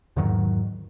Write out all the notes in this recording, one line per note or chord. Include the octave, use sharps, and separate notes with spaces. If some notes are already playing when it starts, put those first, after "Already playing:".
E2 G#2 D#3 F#3